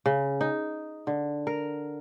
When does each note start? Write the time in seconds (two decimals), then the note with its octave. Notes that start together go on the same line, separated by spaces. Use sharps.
0.06 C#3
0.41 D#4
1.07 D3
1.47 A#4